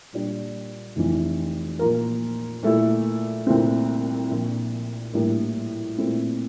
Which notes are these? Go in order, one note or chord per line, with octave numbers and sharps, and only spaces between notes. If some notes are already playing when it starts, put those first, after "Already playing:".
A#2 G3 D4
F1 F2 E3
A#2 F3 A#3 F4 A#4
A#2 A3 E4 A4
C2 A#2 A3 C4
A#1 A#2 F3
A#1 A2 G3 A#3 D4
A#2 A3 C4 E4